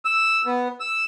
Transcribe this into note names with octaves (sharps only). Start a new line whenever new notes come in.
E6
B3
E6